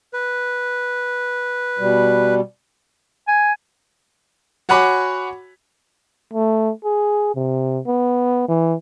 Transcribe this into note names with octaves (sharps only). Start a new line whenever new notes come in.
B4
B2 G3
G#5
F#4 C#5 F#5 G#5 B5 D6
A3
G#4
C3
B3
E3